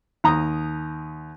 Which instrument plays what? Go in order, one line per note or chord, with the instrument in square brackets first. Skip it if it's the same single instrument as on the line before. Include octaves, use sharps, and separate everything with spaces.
[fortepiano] D#2 A#5 D#6